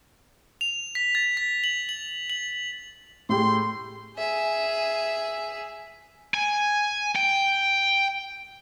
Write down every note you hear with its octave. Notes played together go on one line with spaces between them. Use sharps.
F7
B6
A6
B6
F#7
F#7
F#7
A2 G4 G#4 C6
G#4 E5
G#5
G5